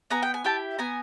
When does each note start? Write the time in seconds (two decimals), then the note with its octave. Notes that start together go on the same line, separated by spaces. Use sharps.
0.10 B3 G#5 A#5
0.23 G5
0.34 G#5
0.44 E4 G4 G5 A5
0.78 B3 G#5 A#5